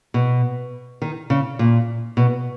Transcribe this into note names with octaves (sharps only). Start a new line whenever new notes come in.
B2
D#3
C#3
A#2
B2